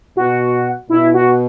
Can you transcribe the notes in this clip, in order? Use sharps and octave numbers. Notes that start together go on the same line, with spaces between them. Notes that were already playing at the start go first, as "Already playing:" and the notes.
B2 F#4
B2 E4
F#4